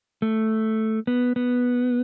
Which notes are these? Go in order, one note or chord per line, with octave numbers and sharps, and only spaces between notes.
A3
B3
B3